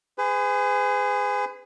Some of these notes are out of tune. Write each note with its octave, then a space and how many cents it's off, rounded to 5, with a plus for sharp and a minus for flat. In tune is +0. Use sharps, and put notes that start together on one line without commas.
G#4 -15 B4 +40